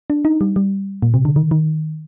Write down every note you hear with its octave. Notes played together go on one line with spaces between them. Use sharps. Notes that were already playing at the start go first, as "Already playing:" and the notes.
D4
D#4
G3
G3
A#2
C3
D3
D#3
D#3